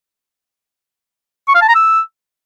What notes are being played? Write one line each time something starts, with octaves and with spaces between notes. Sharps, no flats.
C#6
F5
A5
A#5
E6